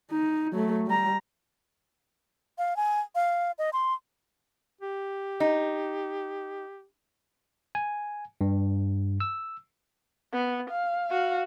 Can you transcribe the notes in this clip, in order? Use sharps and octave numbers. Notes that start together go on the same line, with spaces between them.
D#4
F#3 A3
G3 A#5
F5
G#5
F5
D#5
C6
G4
D#4
G#5
G2
E6
B3
F5
F#4 F5